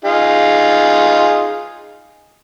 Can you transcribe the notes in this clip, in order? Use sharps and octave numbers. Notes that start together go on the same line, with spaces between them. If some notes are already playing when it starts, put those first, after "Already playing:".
D#4 F4 G#4